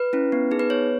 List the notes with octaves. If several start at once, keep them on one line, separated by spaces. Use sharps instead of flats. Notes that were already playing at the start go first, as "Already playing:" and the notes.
Already playing: B4
C#4 E4
B3
D#4 G#4
B4
B3 C#5